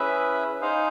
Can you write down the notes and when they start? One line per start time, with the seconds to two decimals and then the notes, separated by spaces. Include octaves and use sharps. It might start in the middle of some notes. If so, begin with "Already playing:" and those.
Already playing: C#4 E4 G#4 B4 E5
0.61 D#4 G#4 C5 F5